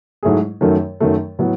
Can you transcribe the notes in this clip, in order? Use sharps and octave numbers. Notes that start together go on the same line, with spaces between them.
G#2 F#3 A3 E4 G#4
F#2 D#3 F#3 A3
F#2 D#3 F#3 A3
A2 F#3 B3